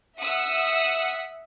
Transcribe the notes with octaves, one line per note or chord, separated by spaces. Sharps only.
E5 F#5 D#6 E6